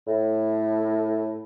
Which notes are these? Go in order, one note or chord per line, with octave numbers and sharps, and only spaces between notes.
A2